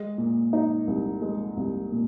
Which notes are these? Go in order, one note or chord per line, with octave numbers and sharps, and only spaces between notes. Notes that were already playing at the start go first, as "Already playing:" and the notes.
Already playing: G#3
A#2
D#4
C2
G#3
C2
A#2